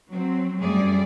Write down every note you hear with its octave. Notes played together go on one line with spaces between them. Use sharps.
F#3 C4
F#2 G3 A3 G#4 D5